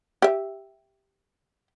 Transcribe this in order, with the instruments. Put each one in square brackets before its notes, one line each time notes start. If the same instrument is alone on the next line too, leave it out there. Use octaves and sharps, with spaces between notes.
[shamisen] G4 E5